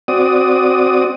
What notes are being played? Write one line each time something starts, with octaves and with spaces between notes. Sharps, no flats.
C4 F#4 D5 D#6